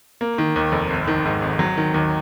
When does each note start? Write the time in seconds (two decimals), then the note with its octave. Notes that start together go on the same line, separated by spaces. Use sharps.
0.21 A#3
0.38 D#3
0.56 D#2
0.72 F1
0.90 G#1
1.07 D#3
1.25 G#2
1.42 G#1
1.59 F#3
1.77 D#3
1.94 D#2